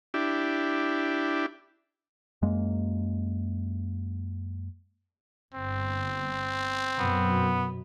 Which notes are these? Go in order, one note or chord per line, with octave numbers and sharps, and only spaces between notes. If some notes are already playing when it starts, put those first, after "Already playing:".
D4 E4 G4
F#2 G#3 A#3
G1 C4
F#2 B2 F#3 B3